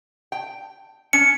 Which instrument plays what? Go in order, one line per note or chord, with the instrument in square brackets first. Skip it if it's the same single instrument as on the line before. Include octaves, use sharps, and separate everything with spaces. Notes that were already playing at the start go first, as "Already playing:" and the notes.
[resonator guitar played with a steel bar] G5
[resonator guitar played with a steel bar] C#4 [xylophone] C#7